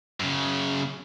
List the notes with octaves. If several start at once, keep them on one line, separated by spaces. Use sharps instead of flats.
F#2 C#3